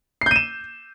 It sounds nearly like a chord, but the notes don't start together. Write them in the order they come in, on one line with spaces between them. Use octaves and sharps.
C7 G6 D#7 E7